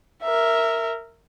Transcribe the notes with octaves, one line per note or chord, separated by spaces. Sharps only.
A#4 E5